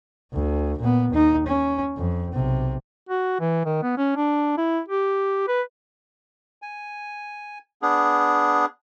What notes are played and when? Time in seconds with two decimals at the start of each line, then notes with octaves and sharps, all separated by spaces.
0.33 D2
0.79 A#2 B3
1.11 D#2 D#4
1.47 C#4
1.97 F2
2.33 B1 C3
3.09 F#4
3.40 E3
3.65 D#3
3.83 B3
3.97 C#4
4.16 D4
4.58 E4
4.88 G4
5.48 B4
6.62 G#5
7.82 B3 D4 G#4